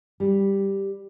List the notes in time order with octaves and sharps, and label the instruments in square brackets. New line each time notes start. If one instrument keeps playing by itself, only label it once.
[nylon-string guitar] G3